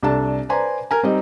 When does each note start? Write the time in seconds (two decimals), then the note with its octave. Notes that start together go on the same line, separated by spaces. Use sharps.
0.03 C2 D4 A4 A5
0.49 B4 C5 D5 G#5 A#5 C6
0.91 A#4 G#5
1.03 G3 C4 D#4 D#5